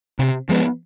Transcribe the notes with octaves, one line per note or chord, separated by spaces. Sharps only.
C3
F3 G#3 B3